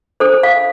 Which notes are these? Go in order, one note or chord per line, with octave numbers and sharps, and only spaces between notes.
D4 A4 C5
F5